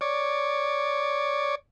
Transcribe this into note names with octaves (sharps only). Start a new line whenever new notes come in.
C#5 D5